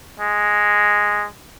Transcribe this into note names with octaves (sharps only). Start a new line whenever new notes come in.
G#3